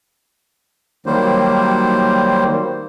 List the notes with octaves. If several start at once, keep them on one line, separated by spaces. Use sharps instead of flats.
D#3 F#3 G3 A#3 C5